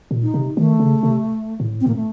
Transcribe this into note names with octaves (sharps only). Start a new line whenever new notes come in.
A#2
D#4
C3
D#3 A3
C#3
C3
A2
C4
A2 A#3
A3